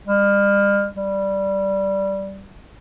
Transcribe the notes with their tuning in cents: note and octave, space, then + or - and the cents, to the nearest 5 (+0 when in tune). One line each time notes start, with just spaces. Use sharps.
G3 +40
G3 -10